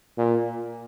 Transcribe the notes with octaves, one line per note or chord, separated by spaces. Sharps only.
A#2